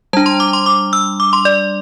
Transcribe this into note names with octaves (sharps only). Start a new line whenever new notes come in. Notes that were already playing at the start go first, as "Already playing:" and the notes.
G3 D4 A5
C6
D6
C6
D6
E6
D6
C6
D5